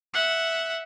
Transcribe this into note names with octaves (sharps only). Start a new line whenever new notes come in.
E5 F#5